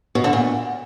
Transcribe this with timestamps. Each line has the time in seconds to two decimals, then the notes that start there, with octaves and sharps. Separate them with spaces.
0.15 B2
0.24 D3
0.33 A#2